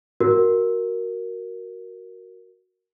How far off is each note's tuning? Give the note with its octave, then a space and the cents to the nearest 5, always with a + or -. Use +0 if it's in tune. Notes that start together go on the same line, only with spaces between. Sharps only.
F#4 +0 A#4 +0